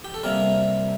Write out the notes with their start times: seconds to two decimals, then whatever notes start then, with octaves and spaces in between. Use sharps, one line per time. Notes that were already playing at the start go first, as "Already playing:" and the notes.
0.04 G4
0.14 A4
0.23 C3 G3 A#3 A#4